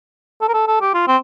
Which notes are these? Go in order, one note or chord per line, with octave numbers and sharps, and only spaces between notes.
A4
A#4
A4
A4
G4
F4
C4